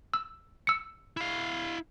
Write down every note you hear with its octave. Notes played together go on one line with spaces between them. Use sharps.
E6
E6 C#7
E4 F5